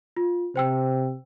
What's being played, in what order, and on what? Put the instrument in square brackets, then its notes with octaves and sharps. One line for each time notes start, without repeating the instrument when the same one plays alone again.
[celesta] F4
[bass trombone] C3 [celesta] C5 G5 E6